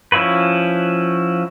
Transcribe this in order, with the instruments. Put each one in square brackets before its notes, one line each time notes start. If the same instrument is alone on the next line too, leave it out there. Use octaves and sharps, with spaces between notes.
[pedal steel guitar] F3 C#4 E4 F#4 B4